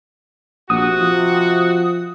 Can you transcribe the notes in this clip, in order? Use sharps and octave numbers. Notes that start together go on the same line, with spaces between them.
A#1 C3 F#4 D#6
F3